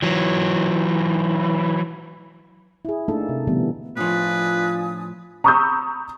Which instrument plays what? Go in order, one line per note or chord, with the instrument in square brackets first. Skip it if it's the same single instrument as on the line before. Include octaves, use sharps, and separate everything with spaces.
[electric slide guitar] E3 F#3
[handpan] E4 G#4
A3 A#3 D4 D#4 A4
C3
B2 D3 E3 G3 A3 B3
[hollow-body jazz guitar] A2 F3 [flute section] D4 G#5 D#6 [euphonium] F4 [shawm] B4
[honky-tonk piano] A#5 B5 C#6 D#6 E6 G6